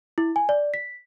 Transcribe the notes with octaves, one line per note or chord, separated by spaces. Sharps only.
E4
G#5
D5
B6